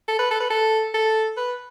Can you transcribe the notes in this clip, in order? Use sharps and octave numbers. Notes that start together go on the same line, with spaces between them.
A4
B4
A4
B4
A4
A4
B4